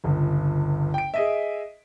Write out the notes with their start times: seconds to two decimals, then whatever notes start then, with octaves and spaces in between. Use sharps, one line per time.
0.04 G1 C#2
0.94 G5 D7
1.14 G#4 D#5 E5